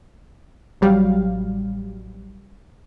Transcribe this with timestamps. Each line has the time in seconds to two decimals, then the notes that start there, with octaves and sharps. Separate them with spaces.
0.81 A1 F#3 G3 F5